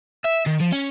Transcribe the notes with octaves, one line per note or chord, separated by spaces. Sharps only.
E5
D#3
F3
C#4